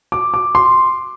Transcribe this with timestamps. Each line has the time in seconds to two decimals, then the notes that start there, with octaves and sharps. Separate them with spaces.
0.12 D6
0.34 D6
0.55 C6